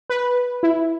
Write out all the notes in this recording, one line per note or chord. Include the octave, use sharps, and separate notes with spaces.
B4
E4